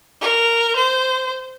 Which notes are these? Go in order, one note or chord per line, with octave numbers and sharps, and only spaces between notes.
A#4
C5